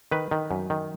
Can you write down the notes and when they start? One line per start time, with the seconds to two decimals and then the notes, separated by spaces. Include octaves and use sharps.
0.11 D#3 B4
0.31 D#3
0.51 F#2
0.70 D#3